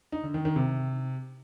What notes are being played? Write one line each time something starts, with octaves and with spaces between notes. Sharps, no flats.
D#4
D3
D#3
D#3
C3